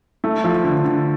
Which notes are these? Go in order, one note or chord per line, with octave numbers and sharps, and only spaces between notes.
A3
F3
D3
D3